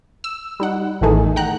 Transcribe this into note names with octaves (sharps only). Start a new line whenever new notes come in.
E6
G3 D#4 F#5
A1 E2 D#3 A3 D#4 G#4
F#5 G5 A#5 F#6